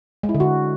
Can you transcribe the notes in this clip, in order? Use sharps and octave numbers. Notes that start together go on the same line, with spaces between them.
G#3
E4
D3
F#4